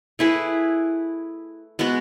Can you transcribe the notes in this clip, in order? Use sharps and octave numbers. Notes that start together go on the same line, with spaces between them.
A3 E4 G#4 B4
G#3 B3 F#4